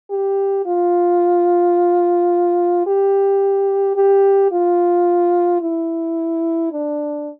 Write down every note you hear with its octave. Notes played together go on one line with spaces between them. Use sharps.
G4
F4
G4
G4
F4
E4
D4